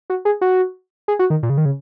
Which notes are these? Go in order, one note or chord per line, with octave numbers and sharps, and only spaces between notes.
F#4
G#4
F#4
G#4
F#4
D#3
A#2
C#3
D#3
C#3